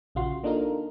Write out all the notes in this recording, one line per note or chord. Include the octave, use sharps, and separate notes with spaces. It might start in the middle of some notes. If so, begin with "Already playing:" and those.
A#1 C#3 F4 F#4 C6
A#3 D4 D#4 F4 A4 A#4